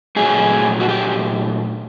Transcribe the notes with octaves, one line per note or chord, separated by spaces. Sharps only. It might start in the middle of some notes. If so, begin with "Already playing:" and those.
A#2 F#3 A3 G#4
F#4
G4